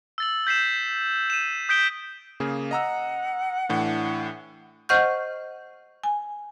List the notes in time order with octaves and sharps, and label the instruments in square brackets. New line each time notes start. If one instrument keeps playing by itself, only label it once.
[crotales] E6 A6 F#7
G6 B6 C7 E7
D#7 E7
D#6 G6 B6 D7 G7
[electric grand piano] C#3 A#3 G#4
[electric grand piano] D#5 A#5 E6 [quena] F#5
[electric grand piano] A2 E3 D4
[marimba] C5 D#5 F#5 C#6 F6 G6
G#5